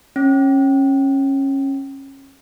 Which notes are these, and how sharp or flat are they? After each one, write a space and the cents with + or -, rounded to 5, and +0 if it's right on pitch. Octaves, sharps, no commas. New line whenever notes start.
C#4 -25